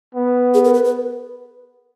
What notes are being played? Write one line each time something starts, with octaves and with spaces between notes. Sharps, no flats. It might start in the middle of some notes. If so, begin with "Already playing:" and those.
B3
G#4
A#4
B4
B4